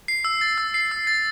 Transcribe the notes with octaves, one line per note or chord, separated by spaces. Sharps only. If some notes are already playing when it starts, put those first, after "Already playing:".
C7
E6
A6
E6
C7
E6
A6